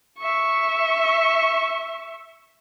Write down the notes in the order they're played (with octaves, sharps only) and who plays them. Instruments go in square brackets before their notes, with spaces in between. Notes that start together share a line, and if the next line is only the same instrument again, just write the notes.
[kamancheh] E5 C#6